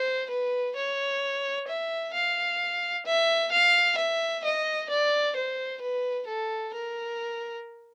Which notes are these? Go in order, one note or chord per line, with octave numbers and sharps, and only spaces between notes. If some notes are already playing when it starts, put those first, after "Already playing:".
Already playing: C5
B4
C#5
E5
F5
E5
F5
E5
D#5
D5
C5
B4
A4
A#4